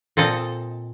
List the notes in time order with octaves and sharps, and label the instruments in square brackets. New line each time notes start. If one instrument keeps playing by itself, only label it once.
[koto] A#2 C4 A4 D#5